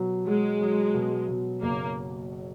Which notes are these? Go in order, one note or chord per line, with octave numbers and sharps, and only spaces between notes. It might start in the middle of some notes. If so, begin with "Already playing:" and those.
Already playing: B2 F#3
F#3 G#3
F#3
B2
B2
F#1 A#3